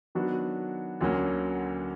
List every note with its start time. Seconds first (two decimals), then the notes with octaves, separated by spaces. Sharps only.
0.15 D#3 F#3 B3 D4 F#4
1.01 D2 D3 F#3 A#3 C#4